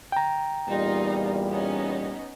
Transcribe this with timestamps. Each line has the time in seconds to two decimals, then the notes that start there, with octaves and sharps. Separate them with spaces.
0.12 G5 A#5
0.68 E2 A#2 G3 D#4 F4
1.48 B3 C#4 D#4